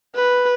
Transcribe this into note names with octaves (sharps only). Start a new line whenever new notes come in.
B4